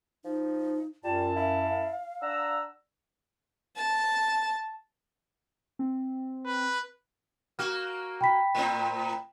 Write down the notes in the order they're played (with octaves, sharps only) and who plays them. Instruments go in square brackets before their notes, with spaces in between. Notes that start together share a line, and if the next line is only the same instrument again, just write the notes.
[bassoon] F3 [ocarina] D#4
[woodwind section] F#2 A5 [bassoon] G3 [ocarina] F4
[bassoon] E4 [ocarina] F5
[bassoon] D4 [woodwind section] F#5 A#5 E6
[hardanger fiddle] A5
[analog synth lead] C4
[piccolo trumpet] B4
[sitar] A#3 F#4 [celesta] F6
[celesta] G5 B5 B6
[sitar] A2 C4